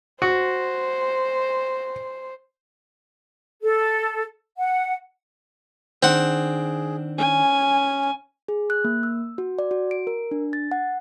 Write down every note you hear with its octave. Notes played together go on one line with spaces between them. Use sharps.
F#4 C5
A4
F#5
D#3 C4 D4 G#4 F#5
C#4 G#5
G#4
F#6
A#3
E6
F#4
D5
F#4
D7
A#4
D4
A6
F#5